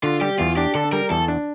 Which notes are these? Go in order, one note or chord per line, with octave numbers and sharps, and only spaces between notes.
D3 F4
G3 G4
E2 F4
D4 G4
D3 A4
G3 A#4
E2 A4
D4